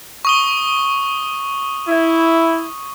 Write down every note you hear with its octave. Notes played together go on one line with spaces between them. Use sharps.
C#6 D#6 G7
E4